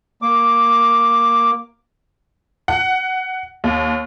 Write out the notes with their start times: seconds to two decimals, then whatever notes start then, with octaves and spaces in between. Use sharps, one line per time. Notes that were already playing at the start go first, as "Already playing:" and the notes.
0.22 A#3 D6
2.68 F#5
3.64 D#2